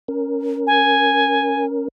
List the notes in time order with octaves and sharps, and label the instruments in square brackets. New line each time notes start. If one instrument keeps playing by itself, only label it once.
[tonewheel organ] C#4 A#4
[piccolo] G#5